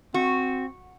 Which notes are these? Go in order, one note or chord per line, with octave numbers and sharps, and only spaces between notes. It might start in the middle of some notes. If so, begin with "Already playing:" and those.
C4 F#4